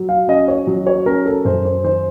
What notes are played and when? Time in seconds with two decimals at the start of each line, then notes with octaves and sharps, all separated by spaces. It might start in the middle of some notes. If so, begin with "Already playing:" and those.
Already playing: F#3
0.09 F5
0.28 C#4 D#5
0.48 C#5
0.67 F#3
0.87 C#5
1.06 C#4 A#4
1.26 A4
1.45 F#2 C5
1.65 C5
1.84 D#3 C5